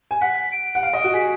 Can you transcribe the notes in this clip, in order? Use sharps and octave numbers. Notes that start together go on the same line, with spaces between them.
G#5
F#5 B6
D7
F#5
F5
D#5
F#4
G#4 B6